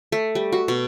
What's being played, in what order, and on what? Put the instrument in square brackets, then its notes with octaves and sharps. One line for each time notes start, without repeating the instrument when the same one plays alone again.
[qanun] A3
G3
F#4
B2